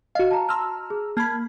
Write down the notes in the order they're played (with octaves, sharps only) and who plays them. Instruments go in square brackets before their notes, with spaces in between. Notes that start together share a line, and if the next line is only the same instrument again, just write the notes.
[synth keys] F#4 F5 [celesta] D#5
[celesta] A5 A#5
[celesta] A5 C6 [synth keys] A#5 E6 F6
[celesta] G#4
[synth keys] A#3 B5 [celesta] A5 G#6